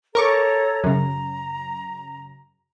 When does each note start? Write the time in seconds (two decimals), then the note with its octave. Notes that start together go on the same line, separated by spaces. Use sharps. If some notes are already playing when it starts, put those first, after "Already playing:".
0.15 A4 A#4 C#5 A#5 C#6 D6
0.84 F#2 C#3 A#5